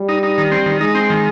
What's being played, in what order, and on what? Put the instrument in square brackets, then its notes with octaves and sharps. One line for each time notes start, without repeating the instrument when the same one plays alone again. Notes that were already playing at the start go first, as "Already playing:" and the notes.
Already playing: [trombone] G3
[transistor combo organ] D#4
D#4
D#3
C4
D#3
[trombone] G#3 [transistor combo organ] D#4
[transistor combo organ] C4
D#3